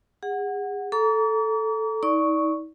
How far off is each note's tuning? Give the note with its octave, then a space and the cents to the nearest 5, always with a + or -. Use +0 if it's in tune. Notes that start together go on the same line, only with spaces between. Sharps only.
G#4 -35 F#5 +0
A4 +0 A#5 +0 D6 -45
D#4 +40 D5 -10 C#6 +0